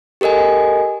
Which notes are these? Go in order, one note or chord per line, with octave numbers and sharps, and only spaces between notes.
G4 A4 A#4 D#5 G#5